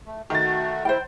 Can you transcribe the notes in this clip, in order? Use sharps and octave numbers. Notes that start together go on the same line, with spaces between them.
A3
D#3 A3 F#4 A6
E4 C5 G5